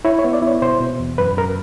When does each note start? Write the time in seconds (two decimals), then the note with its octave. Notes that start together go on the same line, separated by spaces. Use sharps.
0.05 E4 C#5
0.19 C#5
0.24 B3
0.33 D5
0.42 E4 C#5
0.62 B2 C5
0.81 B2
1.00 E2
1.18 F#2 B4
1.38 F#2 A#4